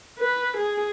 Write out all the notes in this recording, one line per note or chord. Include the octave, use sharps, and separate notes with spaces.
B4
G#4